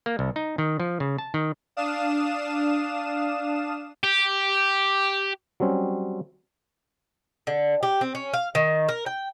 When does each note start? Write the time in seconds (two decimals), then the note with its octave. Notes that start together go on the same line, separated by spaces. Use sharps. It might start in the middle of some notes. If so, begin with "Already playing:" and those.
0.06 A#3
0.19 C2
0.36 D#4
0.58 D#3
0.80 F3
1.00 C#3
1.18 A5
1.34 D#3
1.77 D4 F5 D#6 E7
4.03 G4
5.60 F#3 G3 C4 C#4
7.47 D3
7.83 G4
8.01 C4
8.15 C#4
8.34 F5
8.55 D#3
8.89 A#4
9.06 G5